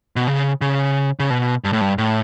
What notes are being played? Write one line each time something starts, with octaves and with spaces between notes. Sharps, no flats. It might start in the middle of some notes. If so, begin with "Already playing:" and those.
B2
C#3
C#3
C#3
B2
G2
A2
G2
A2